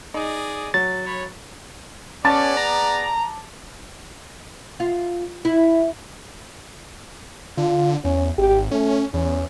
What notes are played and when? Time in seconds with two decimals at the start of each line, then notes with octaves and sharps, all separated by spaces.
0.14 D#4 G#4 D5 D#5
0.74 F#3 A6
1.05 C#5 B5
2.25 B3 C#4 G#4 D5 A5 D6 A6
2.57 A#5
4.80 F4
5.45 E4
7.58 D3 F4
8.05 E2 C#4
8.38 G#1 G4
8.71 A3 C#4
9.14 E2 C#4